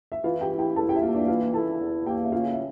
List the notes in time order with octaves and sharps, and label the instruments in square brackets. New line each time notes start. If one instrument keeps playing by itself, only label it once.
[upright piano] E5
[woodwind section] E3 [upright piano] F4 F5
[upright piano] G4 G5
[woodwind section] E4
[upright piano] G4 G5
[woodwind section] E2 [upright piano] A4 A5
[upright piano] G4 G5
E5
[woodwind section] A#3 [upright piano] F4 F5
[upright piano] D4 D5
[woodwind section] E3 [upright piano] F4 F5
[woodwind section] E4 [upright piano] A4 A5
[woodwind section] E2
[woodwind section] A#3 [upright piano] G4 G5
[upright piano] E5
[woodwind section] C#3 [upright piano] F4 F5
[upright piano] E5